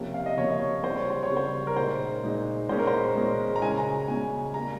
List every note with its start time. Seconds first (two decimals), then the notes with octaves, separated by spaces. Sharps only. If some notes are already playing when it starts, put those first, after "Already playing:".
Already playing: C3 F3 A#3 C#4
0.14 F5
0.26 D#5
0.37 C3 F3 A#3 C#4 C#5
0.48 D#5
0.60 C#5
0.83 C#3 G3 C4 C5
0.96 C#5
1.10 C5
1.23 C#5
1.30 C#3 G3 C4
1.37 C5
1.67 A#4
1.76 A#2 G#3 D#4 C5
2.23 A#2 G#3 D#4
2.69 A#2 G#3 C#4 C5
2.79 A#4
2.87 C5
3.15 A#2 G#3 C#4
3.56 A#5
3.62 C#3 G#3 C#4 G#5
3.77 A#5
4.08 C#3 G#3 C#4 G#5
4.54 G3 A#3 A#5